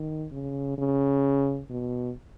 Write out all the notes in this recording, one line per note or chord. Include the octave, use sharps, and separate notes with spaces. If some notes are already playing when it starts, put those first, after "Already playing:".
Already playing: D#3
C#3
C#3
B2